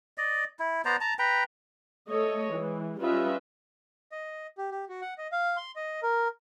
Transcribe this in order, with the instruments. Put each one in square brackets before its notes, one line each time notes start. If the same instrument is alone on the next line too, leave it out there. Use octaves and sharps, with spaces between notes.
[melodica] D5 D#5
E4
B3 C5 D5 A#5
A5 A#5
B4 G5 A#5
[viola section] A3 A4 C#5 D#5
E3 G#3
G3 C#4 F4 B4 D#5 E5
[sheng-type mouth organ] D#5
G4
G4
F#4
F#5
D#5
F5
C6
D#5
A#4